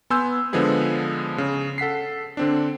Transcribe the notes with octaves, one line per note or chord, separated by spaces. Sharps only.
B3 G#5 C6 E6 G6
D3 F3 G#3 B3 G#4 B4
C#3
A4 F#5 B6 C7
D3 C4 D4